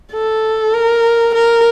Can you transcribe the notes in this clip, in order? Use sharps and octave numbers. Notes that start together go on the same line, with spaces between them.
A4
A#4
A#4